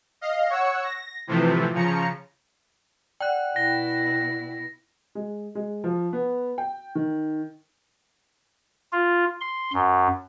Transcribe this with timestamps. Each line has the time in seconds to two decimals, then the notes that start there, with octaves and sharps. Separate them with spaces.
0.21 D#5 F5
0.50 C#5 F#5 C#6 E6
0.84 A#6
1.27 A2 C3 E3 F3 A3
1.74 C#3 F3 A#5 C#7
3.21 D5 F#5 G5 F#6
3.56 B2 E4 A#6
5.15 G#3
5.55 G#3
5.84 F3
6.13 B3
6.58 G5
6.95 D#3
8.92 F4
9.41 C6
9.73 F#2